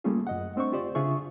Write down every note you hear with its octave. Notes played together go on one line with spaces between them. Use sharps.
G3 A3 A#3 C#4 F4 G#4
F#2 D#5 F#5
A3 C4 D4 C5 C#6
F4 G4 C5 D5
C#3 D4 F4 G#4 E5 C#6